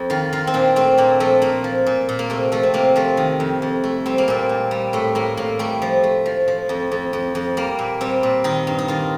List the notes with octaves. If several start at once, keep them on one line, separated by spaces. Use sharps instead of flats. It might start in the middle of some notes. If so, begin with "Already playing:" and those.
Already playing: F2
D#3 F4
D#3 F4
C4
A#2 D4
A3 C4
A#2 A#3
F3 A3
A#2 A#3
F3
A#2
A#2
A#3
C3 A3
F3 A3
C4
C3 A#3
F3 A3
D#3
F2
F2
A3
G3 C4
A#3
A#2 C4
A#2
G3
A2 A3
A2 A#3
A2 A#3
G3 A3
F3
A3
F3
F3
F2
F2
F2
F2
G3 A#3
A#2
G3 C4
A#2
D#3 D#4
G2
D#4
D#3 F4